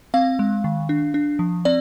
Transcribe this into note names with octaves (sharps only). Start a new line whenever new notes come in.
C4 F5
G#3
D#3
D4
D4
F3
C4 D5